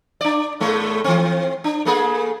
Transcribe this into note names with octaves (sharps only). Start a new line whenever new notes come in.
D4 D5
A2 G#3 A3
E3 C4
D4
A3 A#3 G#4